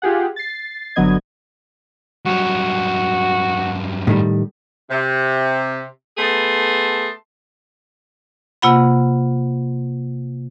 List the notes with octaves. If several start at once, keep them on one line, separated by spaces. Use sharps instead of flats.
F4 G4 G#4 F#5
A6 C7
G1 D3 F#3 B3 D#5 G#6
G2 F#3 F#4
A2 D#3 G3
C3
A3 B3 G#4 A5 C6
C3 A#3 F4 F#5 B5